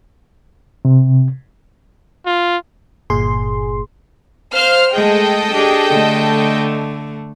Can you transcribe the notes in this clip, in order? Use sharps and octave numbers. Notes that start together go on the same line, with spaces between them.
C3
F4
G1 A#2 G#4 C6
C5 F5 F6
G#3 A3 G#4 A4 D#5 G5
D4 G4 G#4
D3 A3